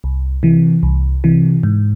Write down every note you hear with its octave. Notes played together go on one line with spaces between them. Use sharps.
C2
C3 E3
C2
C3 E3
G#2